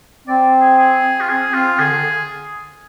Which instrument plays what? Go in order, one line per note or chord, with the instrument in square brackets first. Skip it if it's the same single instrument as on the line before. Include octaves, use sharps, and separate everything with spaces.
[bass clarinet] C4 [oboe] D5
[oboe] G#4
G#4
F4
[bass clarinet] C4 [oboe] G#4
[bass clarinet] C4 [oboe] F4
[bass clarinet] D3 [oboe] G#4
[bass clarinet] D3